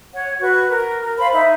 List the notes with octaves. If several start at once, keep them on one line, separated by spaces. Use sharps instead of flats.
C#5 F#5
F#4 B4 C#6
A#4
A#4
C5 F5 B5
D#4 E5